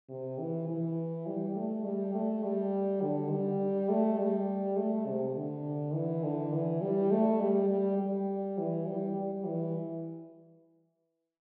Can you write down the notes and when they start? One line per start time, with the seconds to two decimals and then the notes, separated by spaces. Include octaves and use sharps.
0.09 C3
0.39 E3
0.68 E3
1.27 G3
1.56 A3
1.85 G3
2.14 A3
2.44 G3
3.02 D3
3.31 G3
3.90 A3
4.19 G3
4.77 A3
5.07 C3
5.36 D3
5.94 E3
6.24 D3
6.53 E3
6.81 G3
7.11 A3
7.41 G3
7.70 G3
7.99 G3
8.58 E3
8.87 G3
9.16 G3
9.45 E3